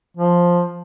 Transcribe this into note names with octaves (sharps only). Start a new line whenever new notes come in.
F3